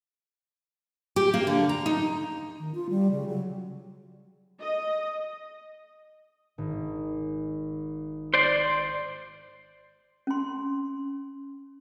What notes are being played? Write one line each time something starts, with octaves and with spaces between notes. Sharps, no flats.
G4
A#3
D3
A#5
D#4
D#3
F4
G3
C#3
F#3
D#5
G#1
C5 D5
C#4 C6